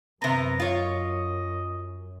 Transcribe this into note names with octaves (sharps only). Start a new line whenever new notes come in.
F#2 C3 B3 A#5
F4 C#5 D#5